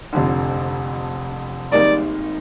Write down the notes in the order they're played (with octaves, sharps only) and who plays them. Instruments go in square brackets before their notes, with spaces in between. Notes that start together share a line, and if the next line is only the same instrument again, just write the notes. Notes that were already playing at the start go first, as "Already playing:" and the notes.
[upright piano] F1 F2 D3
[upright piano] G#1 G#2 G3 A#3 D#4 [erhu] D5